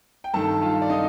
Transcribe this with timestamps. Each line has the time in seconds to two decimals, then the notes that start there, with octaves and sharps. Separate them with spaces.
0.24 G5
0.34 G2 D#3 A4 A5
0.62 F4 F5
0.82 D5
0.90 D#3 D#4 D#5